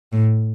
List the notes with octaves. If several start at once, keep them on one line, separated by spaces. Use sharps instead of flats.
A2